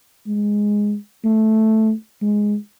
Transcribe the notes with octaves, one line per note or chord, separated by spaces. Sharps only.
G#3
A3
G#3